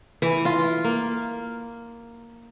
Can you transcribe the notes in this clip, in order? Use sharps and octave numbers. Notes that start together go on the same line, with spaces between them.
E3
F4
A#3